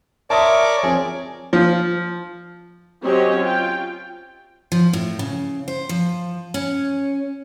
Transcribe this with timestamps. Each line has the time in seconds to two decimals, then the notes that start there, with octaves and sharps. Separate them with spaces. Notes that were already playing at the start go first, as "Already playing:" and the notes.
0.30 A#4 C#5 D5 E5 A5 C6 D6 D#6
0.83 F3 C4 G#4 C#5
1.53 F3
3.04 F#3 C4 C#4 G4 C#5 D#5
3.39 F4 G5
4.72 F3
4.93 A2
5.19 C#3
5.68 C5
5.89 F3
6.54 C#4